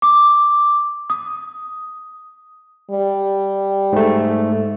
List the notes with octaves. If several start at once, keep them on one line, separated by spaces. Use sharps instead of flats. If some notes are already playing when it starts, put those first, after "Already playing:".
D6
D#6
G3
G#2 A3